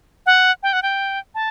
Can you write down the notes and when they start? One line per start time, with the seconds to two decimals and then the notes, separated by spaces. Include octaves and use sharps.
0.26 F#5
0.63 G5
0.73 F#5
0.83 G5
1.35 A5